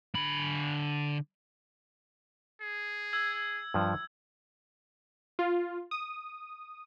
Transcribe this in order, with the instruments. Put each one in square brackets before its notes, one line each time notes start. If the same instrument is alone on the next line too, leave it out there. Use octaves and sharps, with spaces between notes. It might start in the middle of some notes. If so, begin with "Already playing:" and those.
[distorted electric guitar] D3 B5
[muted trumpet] G#4
[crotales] E6 G#6
[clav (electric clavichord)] G2 F3
[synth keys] F4
D#6